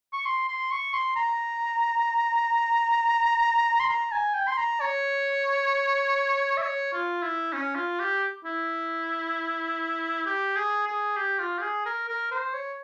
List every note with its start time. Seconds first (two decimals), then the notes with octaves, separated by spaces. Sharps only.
0.13 C#6
0.26 C6
0.48 C6
0.72 C#6
0.94 C6
1.16 A#5
3.80 C6
3.90 A#5
4.12 G#5
4.34 G5
4.47 C6
4.57 A#5
4.81 C#5
6.57 E5
6.62 C#5
6.93 F4
7.23 E4
7.53 C#4
7.75 F4
7.99 G4
8.44 E4
10.26 G4
10.56 G#4
10.87 G#4
11.17 G4
11.39 F4
11.58 G4
11.62 G#4
11.86 A#4
12.08 A#4
12.31 C5
12.53 C#5